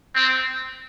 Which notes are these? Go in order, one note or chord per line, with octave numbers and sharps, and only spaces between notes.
C4